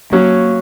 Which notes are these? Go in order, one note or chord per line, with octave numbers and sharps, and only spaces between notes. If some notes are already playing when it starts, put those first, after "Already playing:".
F#3 A#3 C#4